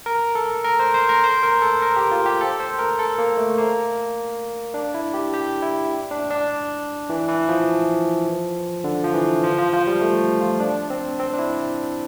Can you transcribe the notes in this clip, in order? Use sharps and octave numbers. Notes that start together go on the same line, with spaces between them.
A#4
A4
A#4
C5
C5
A#4
C5
A#4
A4
A#4
G4
F4
G4
A4
C5
A#4
A4
A#3
A3
A#3
D4
E4
G4
G4
E4
D4
D4
E3
E3
F3
D3
F3
E3
F3
F3
F3
G3
A3
F4
D4
C4
C4
D4
E4